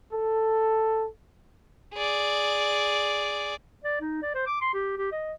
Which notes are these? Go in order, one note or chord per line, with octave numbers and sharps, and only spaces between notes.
A4
G#4 D5
D5
D#4
D5
C5
D6
C6
G4
G4
D#5